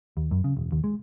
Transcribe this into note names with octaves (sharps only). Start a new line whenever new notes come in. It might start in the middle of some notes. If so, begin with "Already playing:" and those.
D#2
F#2
C#3
E1
D#2
G#3